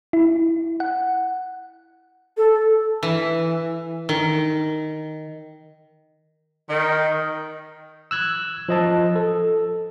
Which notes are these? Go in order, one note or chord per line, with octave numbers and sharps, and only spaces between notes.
E4
F#5
A4
E3
D#3
D#3
E6 F#6 G#6
F3 D#5 A5
A4